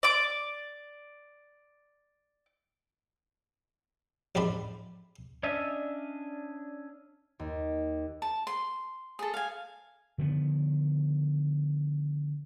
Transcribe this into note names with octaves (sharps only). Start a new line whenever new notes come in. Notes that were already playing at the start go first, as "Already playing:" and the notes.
D5 D6
A1 F2 G#2 D5 B5
C#4 D4 D#5 E5
D#2
A5
C6
G#4 A4
F5 G#5
D3 D#3 F3 B3